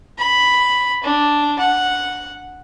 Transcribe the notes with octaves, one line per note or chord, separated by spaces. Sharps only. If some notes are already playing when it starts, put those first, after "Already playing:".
B5
D4
F#5